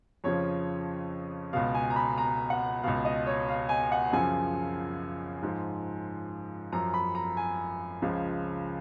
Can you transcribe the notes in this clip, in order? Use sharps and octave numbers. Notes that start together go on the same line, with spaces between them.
F2 C#3 F3 C#5
C#2 B2 F5
G#5
A#5
B5
A#5
F#5
C#2 B2 F5
D#5
C#5
F5
G#5
F#5
F#2 C#3 F3 G#5
G#2 F3
F#2 F3 A#5
B5
A#5
G#5
C#2 C#3 F3